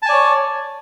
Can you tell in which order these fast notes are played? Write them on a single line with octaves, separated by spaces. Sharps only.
A5 G#5 D5 C#5